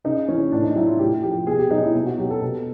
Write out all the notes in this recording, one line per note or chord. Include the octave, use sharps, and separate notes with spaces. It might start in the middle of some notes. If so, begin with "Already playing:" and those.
C#3 D#4
E3 C#4
A2 D4
D#4
F#3 E4
F4
A2 G4
F3 G4
B2 G#4
G4
F#3 D#4
E4
B2
F#4
F#3 G4
A4
B2